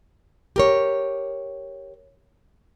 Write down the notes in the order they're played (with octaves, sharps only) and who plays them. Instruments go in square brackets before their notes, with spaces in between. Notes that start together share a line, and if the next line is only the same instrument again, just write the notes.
[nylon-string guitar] G4 A#4 C#5